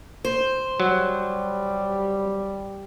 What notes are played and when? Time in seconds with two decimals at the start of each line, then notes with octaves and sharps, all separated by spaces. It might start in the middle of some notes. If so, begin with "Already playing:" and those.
0.25 C5
0.80 F#3 G3